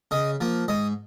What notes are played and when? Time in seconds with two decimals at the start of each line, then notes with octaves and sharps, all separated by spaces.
0.11 C#3 D#5
0.41 F3 A#3
0.68 G#2 D#5